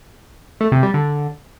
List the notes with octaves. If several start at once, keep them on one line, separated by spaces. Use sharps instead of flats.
A3
C3
G3
D3